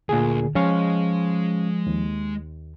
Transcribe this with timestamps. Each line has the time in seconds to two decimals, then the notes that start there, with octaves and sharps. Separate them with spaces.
0.09 D2 A#2 G#4
0.55 F3 G#3 C#4 F5 C#6
1.87 D#2